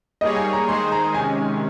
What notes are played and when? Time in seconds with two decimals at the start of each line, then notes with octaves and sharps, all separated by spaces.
0.21 G3 A#3 D#4 G#4 C#5 D#5
0.36 G#5
0.53 A#5
0.68 D#3 G#3 D#4 G#4 C5 C6
0.92 A#5
1.14 C3 D#3 G#3 C#4 G#5